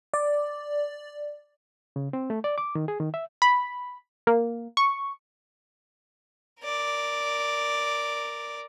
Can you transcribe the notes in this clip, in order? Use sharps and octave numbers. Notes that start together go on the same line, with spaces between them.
D5
C#3
C4
A3
D5
D6
D#3
G#4
D#3
E5
B5
A#3
C#6
A#4 D5